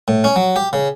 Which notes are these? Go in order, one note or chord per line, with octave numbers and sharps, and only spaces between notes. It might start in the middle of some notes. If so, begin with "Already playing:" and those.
A2
C#4
F#3
G4
C#3